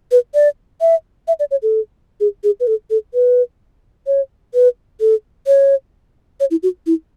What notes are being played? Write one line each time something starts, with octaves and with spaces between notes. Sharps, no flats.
B4
D5
E5
E5
D5
C#5
A4
G#4
G#4
B4
A4
A4
B4
C#5
B4
A4
C#5
C#5
E4
F#4
E4